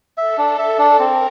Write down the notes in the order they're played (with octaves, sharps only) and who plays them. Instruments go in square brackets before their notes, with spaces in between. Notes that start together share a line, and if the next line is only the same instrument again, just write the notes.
[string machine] A4 [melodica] E5
[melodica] D4
[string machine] A4 [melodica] E5
[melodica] D4
[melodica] C4 [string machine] A#4